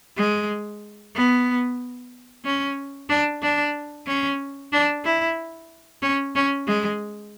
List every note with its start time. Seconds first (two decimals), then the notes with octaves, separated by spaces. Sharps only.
0.17 G#3
1.15 B3
2.45 C#4
3.09 D4
3.42 D4
4.07 C#4
4.73 D4
5.05 E4
6.02 C#4
6.36 C#4
6.67 G#3